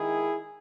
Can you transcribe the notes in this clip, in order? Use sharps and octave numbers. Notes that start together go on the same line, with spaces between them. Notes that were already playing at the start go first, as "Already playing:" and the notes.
Already playing: D#3 G#3 E4 G#4